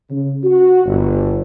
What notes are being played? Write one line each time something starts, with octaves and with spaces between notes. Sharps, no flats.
C#3
F#4
G1